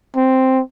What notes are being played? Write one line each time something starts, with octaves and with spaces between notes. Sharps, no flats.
C4